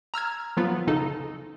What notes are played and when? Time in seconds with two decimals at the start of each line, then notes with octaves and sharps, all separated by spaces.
0.14 A#5 E6 F6 G#6
0.57 F3 F#3 B3 F4
0.87 C#3 D#4 A4